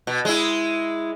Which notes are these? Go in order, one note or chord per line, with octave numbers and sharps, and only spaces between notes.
B2
G#3 E4